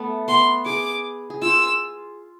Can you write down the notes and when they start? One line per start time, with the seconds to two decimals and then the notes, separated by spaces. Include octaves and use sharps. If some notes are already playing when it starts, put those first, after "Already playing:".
Already playing: A3 B3
0.28 B3 C6
0.66 G#4 D6
1.30 G#4
1.42 F4 E6